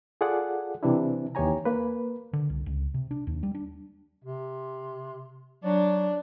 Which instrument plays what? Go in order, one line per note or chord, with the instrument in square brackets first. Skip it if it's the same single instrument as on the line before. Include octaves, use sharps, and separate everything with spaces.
[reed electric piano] F4 G#4 A4 D5 F#5
C3 E3 C4 D4 E4
D#2 E3 G4 C#5 G#5 A#5
A#3 B4
[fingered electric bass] D3
C2
C#2
C3
D4
D#2
G3
D4
[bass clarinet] C3
[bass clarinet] F#3 [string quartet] D4